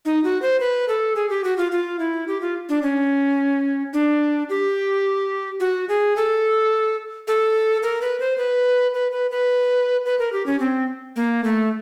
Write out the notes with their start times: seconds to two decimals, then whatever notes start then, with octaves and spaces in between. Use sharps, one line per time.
0.05 D#4
0.24 F#4
0.42 C5
0.60 B4
0.88 A4
1.16 G#4
1.30 G4
1.44 F#4
1.58 F4
1.72 F4
1.99 E4
2.28 G4
2.41 F4
2.69 D4
2.83 C#4
3.93 D4
4.49 G4
5.60 F#4
5.89 G#4
6.17 A4
7.28 A4
7.83 A#4
8.02 B4
8.20 C5
8.38 B4
8.94 B4
9.12 B4
9.31 B4
10.05 B4
10.19 A#4
10.33 G4
10.46 C#4
10.60 C4
11.16 A#3
11.44 A3